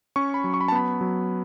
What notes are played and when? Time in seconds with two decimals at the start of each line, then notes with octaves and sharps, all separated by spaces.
0.16 C#4 C#6
0.34 B5
0.44 F#3
0.54 C#6
0.61 B5
0.68 A5
0.72 B3 B5
1.01 F#3